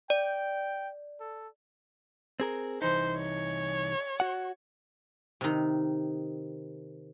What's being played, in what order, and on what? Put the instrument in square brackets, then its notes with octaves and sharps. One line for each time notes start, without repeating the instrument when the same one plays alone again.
[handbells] D5 [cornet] G5
[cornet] A4
[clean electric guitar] C4 G#4 A#4
[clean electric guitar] C2 E3 D#4 [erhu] C5
[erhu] C#5
[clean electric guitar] F#4 F#5
[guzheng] C3 D#3